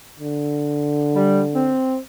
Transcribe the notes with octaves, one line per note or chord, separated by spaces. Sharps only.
D3
G3
C4